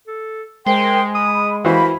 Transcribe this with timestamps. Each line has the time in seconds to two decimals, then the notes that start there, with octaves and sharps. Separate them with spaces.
0.07 A4
0.66 G#3 A#4 C5 G5 C6
1.15 B5 D#6
1.65 E3 F#4 A#4 C5 F5 B5